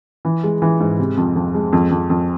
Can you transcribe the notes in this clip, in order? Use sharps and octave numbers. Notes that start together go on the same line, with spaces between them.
E3
G#3
E3
G#2
C3
F2
F2
G#3
F2
F2
F2